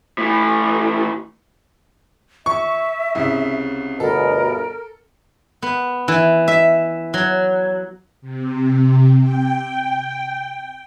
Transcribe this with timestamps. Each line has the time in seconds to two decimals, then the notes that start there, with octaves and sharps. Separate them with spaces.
0.18 A2 E3
2.46 E5 C#6
3.15 C2 C#3
4.00 G1 D2 B2 A4 A#4
5.62 B3
6.08 E3
6.48 E5
7.14 F#3
8.21 C3
9.19 G5